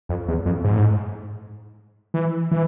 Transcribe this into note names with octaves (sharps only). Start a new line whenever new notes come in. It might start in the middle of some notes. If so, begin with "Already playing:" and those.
F2
E2
F2
G#2
A2
G#2
E3
E3